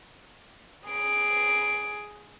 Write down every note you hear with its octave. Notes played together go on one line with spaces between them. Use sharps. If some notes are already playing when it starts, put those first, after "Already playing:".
G#4 D7